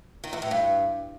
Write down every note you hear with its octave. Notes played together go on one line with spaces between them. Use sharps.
D#3
E2
A2
G2